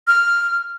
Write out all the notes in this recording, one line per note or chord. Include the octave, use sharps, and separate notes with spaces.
F6